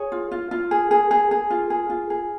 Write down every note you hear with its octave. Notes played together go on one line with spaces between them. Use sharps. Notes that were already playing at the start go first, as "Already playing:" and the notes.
Already playing: G#4 C#5
F4
F4
F4
G#4
G#4
G#4
G#4
F4
G#4
F4
G#4